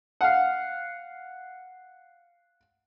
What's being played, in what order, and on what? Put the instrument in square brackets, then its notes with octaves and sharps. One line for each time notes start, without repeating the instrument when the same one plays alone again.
[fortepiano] F5 F#5